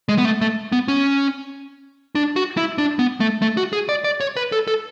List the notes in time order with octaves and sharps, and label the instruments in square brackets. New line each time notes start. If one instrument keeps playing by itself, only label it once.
[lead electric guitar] G#3
B3
A3
A3
B3
C#4
D4
F#4
E4
D4
B3
A3
A3
F#4
G#4
D5
D5
C#5
B4
A4
A4